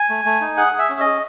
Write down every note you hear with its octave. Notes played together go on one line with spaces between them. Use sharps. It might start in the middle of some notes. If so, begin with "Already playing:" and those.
Already playing: G#5
A3
A3
D#4
G#4 F#5
G#4
E5
C#4
D#5
G#4